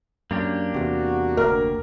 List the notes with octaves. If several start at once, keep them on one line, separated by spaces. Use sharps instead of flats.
F#2 A#3 D4 G4
E2 C3 F#4
F1 D2 A#4